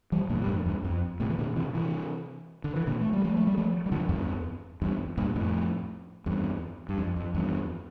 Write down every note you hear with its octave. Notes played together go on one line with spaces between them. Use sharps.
E3 G3
G2 A#2
G2
F2 A2
E2 G2
F2
A2 C3
E3
A#2 D3
C3 E3
C3 E3
D3
E3
A#2 D3
A3
G3
F3 A3
A3
G3
F3 A3
G3
D3 F3
E2 G2
E2 G2
G2 A#2
F2 A2
E2 G2
G2
F2
F2
E2 G2